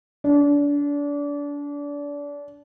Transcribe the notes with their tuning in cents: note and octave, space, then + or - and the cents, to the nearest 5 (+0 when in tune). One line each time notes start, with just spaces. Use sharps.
D4 -30